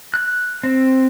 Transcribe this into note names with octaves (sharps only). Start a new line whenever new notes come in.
F#6
C4